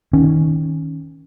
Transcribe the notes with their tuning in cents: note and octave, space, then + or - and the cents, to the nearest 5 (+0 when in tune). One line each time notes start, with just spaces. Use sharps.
D#3 +20 C#4 +0